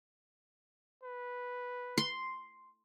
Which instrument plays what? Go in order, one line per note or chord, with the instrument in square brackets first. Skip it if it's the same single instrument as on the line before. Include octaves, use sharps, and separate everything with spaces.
[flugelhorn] B4
[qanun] C6